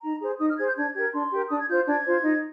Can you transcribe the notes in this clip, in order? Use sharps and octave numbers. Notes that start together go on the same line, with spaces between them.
D#4 A#5
G#4 C5
D#4 D#6
F6
G#4 C5 G#6
G6
D4 G#6
G4 A#4 G#6
D4 C6
G4 A#4
D4 D#6
G#6
F4 C5 G6
D4 G#6
F4 C5
D#4